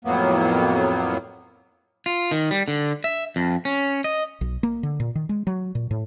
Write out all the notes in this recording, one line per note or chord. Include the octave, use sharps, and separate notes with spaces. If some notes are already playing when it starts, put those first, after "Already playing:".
F2 A2 F#3 A#3 B3
F4
D#3
G3
D3
E5
F2
C#4
D#5
B1
A#3
D3
A#2
D#3
G#3
F#3
A#2
A2